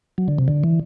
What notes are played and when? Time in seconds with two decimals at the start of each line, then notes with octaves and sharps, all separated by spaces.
0.18 F#3
0.28 D3
0.38 C3
0.48 D3
0.64 E3